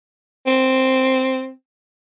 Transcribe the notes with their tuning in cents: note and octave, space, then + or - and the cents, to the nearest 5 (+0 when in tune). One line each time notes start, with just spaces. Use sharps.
C4 +0